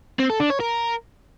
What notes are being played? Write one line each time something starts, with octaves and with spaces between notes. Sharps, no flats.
C4
A4
D4
C#5
A#4